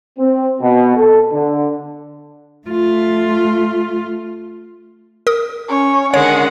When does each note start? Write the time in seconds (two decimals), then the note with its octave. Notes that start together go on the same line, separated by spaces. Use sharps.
0.19 C4
0.61 B2
0.96 A4
1.32 D3
2.68 A3 F4
5.27 A#4 D#6
5.69 C#4 C#5
6.14 D3 D#3 G#3 C#5 F#5